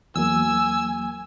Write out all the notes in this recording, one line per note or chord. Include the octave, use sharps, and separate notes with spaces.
E2 F#3 A#3 G#5 E6